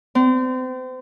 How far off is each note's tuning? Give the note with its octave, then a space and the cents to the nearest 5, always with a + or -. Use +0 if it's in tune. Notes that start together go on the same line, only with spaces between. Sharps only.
C4 -35